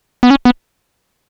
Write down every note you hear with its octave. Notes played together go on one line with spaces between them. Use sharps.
B3
C#4
B3